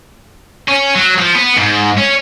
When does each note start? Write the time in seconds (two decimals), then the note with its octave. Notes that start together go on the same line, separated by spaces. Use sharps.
0.68 C#4
0.95 F#3
1.18 F3
1.35 B3
1.57 G#2
1.97 C#4